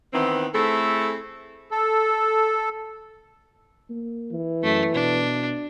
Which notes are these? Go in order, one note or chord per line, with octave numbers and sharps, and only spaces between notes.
D#3 E3 B3 C4
A3 C4 E4 G#4 A4
A4
A#3
E3
F#2 A3
B2 D4